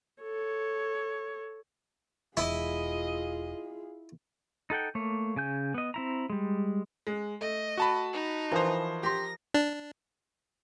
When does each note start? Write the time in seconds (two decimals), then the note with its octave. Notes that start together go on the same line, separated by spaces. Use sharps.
0.23 A4 C#5
2.37 E1 E4 F4 G#4 D#5
4.70 D#4 A4 F#5 G5
4.95 A3 A#3 C#5
5.36 C#3 G#5 G6
5.74 B3 D#5
5.94 C4 E4 A#5
6.30 G3 G#3
7.07 G#3
7.41 A3 D#5
7.78 F#4 A5 B5
8.13 D#4
8.51 E3 F3 A#4 C5 D#5
9.03 G4 C6 A#6
9.54 D4